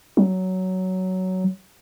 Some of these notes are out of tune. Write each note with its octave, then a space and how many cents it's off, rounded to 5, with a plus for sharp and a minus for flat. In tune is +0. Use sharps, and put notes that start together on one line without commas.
F#3 +10